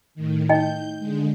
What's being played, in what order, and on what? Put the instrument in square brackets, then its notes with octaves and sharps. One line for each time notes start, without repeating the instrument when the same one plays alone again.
[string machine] A2 D#3
[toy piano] D#4 D#5 G5 [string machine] G6
[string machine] D3 G#3